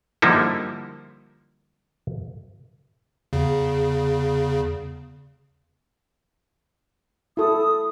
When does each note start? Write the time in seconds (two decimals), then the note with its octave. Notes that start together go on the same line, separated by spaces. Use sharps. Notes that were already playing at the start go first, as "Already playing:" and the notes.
0.22 D3 F3 G3 A#3 D#4 E4
3.33 E2 C#3
7.37 E4 A4 D#6